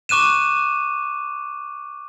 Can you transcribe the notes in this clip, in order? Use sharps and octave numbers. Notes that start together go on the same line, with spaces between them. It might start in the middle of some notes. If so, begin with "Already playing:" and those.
C#6 D6 F#6 D#7 E7